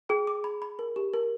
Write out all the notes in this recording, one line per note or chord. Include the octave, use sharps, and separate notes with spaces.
G#4 G5
D6
B5
B5
A#4
G4
A#4